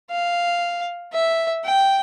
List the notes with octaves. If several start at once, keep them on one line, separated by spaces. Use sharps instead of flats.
F5
E5
G5